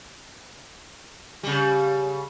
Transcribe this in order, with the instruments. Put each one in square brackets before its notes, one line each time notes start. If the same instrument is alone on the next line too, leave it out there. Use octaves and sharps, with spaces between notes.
[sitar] C#3 G3